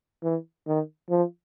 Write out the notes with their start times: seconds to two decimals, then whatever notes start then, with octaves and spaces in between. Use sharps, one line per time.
0.23 E3
0.67 D#3
1.09 F3